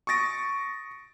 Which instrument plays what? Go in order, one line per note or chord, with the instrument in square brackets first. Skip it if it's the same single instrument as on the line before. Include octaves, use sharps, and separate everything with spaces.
[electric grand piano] C#6 D#6 A6 A#6 D7